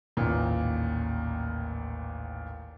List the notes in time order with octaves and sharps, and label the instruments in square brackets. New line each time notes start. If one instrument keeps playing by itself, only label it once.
[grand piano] A1 D#2 A#2